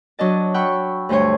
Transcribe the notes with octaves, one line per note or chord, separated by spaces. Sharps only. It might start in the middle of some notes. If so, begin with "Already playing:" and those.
F#3 D4 D#5 A5
F#5 G5 B5 C#6 E6
D2 G2 A3 C5 C#5